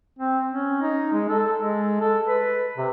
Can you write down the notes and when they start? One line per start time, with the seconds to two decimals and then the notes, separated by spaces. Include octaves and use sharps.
0.19 C4
0.49 C#4
0.81 D#4
1.13 G#3
1.30 A4
1.58 G#3
2.01 A4
2.28 B4
2.78 C3